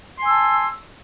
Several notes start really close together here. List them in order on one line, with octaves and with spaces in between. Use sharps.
C6 G#5 E6 A5